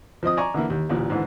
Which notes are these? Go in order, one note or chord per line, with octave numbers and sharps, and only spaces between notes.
F3 C4 D#5 D#6
D5 G#5 A#5 C#6
D3 E3 A#3 E4
D#2
A1 D2 A#2
G#2 D3 E3